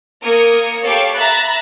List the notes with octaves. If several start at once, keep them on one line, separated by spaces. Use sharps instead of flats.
A#3 A#4 D#6 G#6 C#7
G4 A4 C#5 F5 B5 D6
E5 A#5 B5 F#6 A6